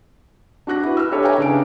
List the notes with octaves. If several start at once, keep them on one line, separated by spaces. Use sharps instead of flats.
D4 F#4 F#6 A#6
E4 B4
E6 F6
D4 G4 A4 B4 C#5
B4 C#5 E5 G5 G#5 A#5
C#3 D4 D7